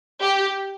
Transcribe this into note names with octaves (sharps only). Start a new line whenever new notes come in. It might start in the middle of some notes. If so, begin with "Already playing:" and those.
G4